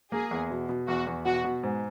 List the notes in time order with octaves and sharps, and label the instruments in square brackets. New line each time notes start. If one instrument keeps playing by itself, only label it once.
[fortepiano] A#3 [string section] G#4
[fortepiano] E2
B2
B2
[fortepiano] E2 [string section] F#4
[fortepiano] E2
[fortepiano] B2 [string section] F#4
[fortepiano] B2
G#2